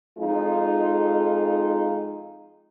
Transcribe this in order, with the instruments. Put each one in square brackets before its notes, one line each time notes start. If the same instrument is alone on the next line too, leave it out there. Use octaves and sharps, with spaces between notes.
[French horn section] F2 G#3 D#4 F4